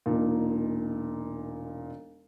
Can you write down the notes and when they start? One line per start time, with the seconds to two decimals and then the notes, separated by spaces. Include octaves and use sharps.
0.06 E1 A#2 D#4